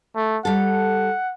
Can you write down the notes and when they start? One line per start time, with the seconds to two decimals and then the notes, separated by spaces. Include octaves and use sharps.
0.16 A3
0.45 G3 A4 F#5